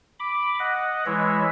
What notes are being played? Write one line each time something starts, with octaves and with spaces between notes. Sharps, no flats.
B5 D6
D#5 F#5
E3 G#3 E4 C#5 E5